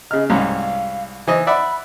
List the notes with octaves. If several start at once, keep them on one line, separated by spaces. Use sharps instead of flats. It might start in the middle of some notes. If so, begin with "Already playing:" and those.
C#3 D#5 F6
C2 G#2 C#4 F5
E3 C5 D#5
D5 E5 F#5 B5